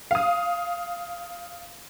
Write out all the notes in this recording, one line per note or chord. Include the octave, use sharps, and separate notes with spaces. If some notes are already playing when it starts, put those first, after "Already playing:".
F5 D#6